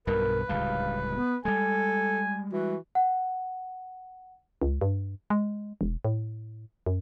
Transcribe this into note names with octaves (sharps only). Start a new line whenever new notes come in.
B1 G2 B2 A#4 B4
D1 C#2 G3 F5
B3
G3 G#3 A4 G#5
E3 F#4
F#5
C#2
G2
G#3
E1
A2
F#2